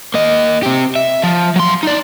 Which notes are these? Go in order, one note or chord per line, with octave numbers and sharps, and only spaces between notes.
A#3 D#5
C4 G4
E5
F3
F#3 C6
D#4 D5